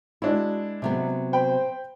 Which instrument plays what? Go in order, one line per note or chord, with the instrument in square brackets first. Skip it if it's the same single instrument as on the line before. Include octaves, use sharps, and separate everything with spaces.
[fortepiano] G#3 D4 E4 [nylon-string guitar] F#4
[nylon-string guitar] C3 F#3 B3
[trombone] C5 [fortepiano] G5 B5